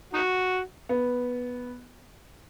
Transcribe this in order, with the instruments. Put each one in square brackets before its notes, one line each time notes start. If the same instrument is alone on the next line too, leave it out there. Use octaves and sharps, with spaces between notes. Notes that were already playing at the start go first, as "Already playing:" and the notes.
[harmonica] D#4 F#4
[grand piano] B3